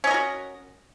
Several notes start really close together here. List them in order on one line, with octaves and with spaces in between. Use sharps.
C#4 D#5 A#4 F#4